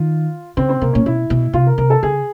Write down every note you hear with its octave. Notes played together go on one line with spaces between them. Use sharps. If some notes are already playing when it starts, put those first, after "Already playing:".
Already playing: D#3 F4
C#3 C4
C4
C3 A#3
A#2 C#4
B2 E4
B2
C3 F4
A#4
C3 A#4
A4
C#3 G#4